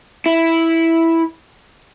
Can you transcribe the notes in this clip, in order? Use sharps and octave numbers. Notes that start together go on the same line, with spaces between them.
E4